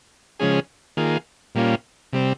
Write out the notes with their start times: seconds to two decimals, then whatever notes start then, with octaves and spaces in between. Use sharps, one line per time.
0.40 C#3 F3 G#3 C#4 G#4
0.97 D#3 A#3 F4 G#4
1.55 A#2 G3 A#3 C#4 F4
2.13 C3 G3 C4